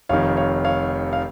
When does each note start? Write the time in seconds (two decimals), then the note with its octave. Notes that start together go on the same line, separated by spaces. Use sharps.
0.09 F1 F2 D#3 C#5 F5
0.37 C#5 F5
0.65 C#5 F5
1.13 F5